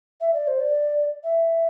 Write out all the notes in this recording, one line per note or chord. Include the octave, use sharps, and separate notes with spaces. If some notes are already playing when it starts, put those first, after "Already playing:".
E5
D5
C5
D5
E5